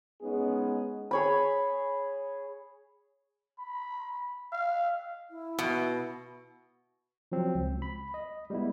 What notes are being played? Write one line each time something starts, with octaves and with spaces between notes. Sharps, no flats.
G#3 B3 C#4 D#4 G#4
G#4 C#5 B5
B5
F5
E4
B2
F3 F#3 C4
C#2
B5
D#5
G3 G#3 B3 E4